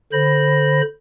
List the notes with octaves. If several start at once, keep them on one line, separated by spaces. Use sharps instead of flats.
D3 C5 B5 A#6